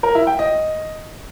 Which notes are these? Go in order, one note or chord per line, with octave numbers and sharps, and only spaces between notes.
A#4
E4
G5
D#5